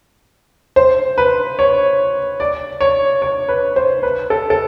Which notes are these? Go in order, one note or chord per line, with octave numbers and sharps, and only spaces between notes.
C5
B4
C#5
D5
C#5
C#5
B4
C5
B4
A4
A4